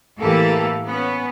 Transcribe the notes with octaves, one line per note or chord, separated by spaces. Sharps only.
A2 E3 A#3 G4 A4
B3 C#4